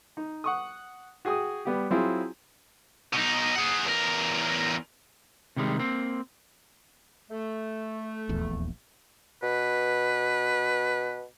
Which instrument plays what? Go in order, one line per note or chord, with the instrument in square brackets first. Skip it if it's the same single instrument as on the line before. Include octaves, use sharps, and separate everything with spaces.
[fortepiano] D#4
F#5 C#6 D#6
F#4 G#4 G5 D#6
G3 B3 G4
F#3 C4 E4 F4 G#4 G#5
[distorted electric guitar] B2 D#4
G#4 F#5
E2 A#4
[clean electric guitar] C3 D#3 G3 G#3
A#3 C4
[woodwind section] A3
[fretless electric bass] D#1 A#1 E2
[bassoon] B2 [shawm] B4